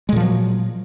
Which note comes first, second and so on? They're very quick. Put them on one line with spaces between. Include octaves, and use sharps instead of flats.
G#3 A#2 F3 F#3